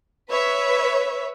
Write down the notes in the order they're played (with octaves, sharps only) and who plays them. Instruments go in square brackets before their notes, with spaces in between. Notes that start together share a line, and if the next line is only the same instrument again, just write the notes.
[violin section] B4 C#5 E5